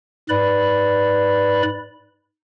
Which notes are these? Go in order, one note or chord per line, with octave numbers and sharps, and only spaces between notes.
G#2 B4 D5 B5